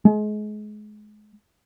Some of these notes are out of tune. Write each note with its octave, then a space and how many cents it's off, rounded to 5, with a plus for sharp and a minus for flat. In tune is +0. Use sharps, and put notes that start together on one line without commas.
G#3 +30